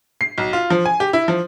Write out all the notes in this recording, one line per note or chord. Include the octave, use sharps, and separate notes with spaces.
C7
B1
F4
F3
G#5
G4
E4
F3